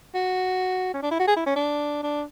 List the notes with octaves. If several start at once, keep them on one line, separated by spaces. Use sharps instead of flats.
F#4
C#4
D4
E4
F#4
G#4
E4
C#4
D4
D4